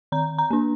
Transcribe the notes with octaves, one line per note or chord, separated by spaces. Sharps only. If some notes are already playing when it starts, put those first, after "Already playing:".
D#3 A#5
A#5
A#3 D4